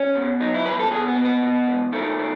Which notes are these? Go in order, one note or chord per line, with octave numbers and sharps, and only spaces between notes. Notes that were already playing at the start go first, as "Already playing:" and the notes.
Already playing: C#4
B2
F#3 D#4
E4
E2 B4
A4
B2 G#4
B3
B2
B3
B2
E2
D#3 A3
D#3